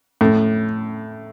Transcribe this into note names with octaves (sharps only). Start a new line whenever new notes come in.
A2